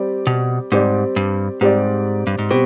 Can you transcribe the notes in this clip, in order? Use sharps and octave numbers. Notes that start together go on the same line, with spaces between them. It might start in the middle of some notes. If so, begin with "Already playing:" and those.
Already playing: G3 C4 G4 D5
B2
G#2 G3 C4 G4 D5
G2
G#2 G3 C4 G4 D5
G2
G#2
B2 G3 C4 G4